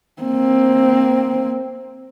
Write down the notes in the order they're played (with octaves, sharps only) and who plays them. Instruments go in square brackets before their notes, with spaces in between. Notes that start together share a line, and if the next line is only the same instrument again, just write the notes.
[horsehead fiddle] A#3 C4